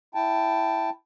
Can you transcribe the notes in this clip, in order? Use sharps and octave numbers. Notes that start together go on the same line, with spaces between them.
E4 G5 A5